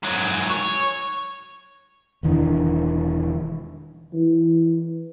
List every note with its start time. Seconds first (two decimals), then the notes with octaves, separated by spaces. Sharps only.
0.03 G#2 F#3
0.50 C#5
2.23 E1 D#3 E3 D4
4.13 E3